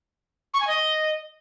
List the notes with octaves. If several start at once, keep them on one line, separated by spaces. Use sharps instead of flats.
C#6
G#5
D#5